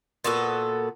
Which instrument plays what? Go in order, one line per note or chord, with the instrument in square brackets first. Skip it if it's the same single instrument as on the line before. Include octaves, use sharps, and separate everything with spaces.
[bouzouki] A#2 B3 F#4 A4